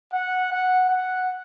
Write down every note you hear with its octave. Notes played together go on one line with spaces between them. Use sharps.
F#5
F#5
F#5